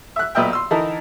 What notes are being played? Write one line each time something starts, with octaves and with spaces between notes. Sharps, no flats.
E5 F#6
B1 A#2 B4 D#5 E5 G5
C6 E6
D3 E3 D#4 E4 A#4 A5